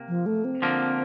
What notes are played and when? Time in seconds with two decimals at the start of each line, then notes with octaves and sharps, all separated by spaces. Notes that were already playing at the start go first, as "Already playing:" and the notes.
Already playing: C3 A#3
0.08 F3
0.26 A3
0.44 C4
0.62 D3 F3 A#3